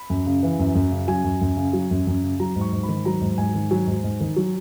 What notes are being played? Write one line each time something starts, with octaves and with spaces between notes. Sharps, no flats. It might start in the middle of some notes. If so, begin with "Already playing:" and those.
Already playing: B5
F#2
C#3
E3
F#2
F#2
C#3
F#3 G#5
F#2
F#2
C#3
F#3
F#2
F#2
C#3
F#3 A#5
G#2
C#6
G#2
B5
D#3
F#3 A#5
G#2
G#2 G#5
D#3
F#3 G#5
G#2
G#2
D#3
F#3